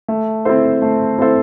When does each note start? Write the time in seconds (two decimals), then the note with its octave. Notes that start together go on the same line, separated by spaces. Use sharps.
0.08 A3
0.45 C4 E4 A4 C5
0.82 A3
1.19 C4 E4 A4 C5